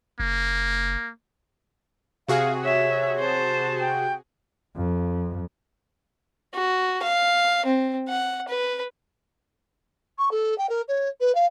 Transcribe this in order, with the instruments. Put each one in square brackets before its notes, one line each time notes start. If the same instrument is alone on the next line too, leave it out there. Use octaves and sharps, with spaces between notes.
[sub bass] F#1 [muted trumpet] A#3
[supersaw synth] C3 F#4 G#4 [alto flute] F5
[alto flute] C#5 [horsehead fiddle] E5
[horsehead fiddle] C5 A5
[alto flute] G5
[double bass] F2
[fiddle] F#4
F5
C4
F#5
B4
[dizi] C#6
A4
G5
A#4
C#5
B4
F5